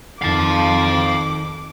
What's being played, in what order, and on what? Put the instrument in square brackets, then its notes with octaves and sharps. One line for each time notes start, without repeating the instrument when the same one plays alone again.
[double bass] F2 [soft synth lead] D#3 [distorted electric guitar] F5 A5 [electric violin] D6